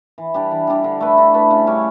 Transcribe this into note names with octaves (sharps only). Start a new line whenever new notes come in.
E3
G3 D4 G4
E3
G3 D4 G4
D3
A3 E4 B4
D3
A3 E4 B4
C#3
G3 C#4 G4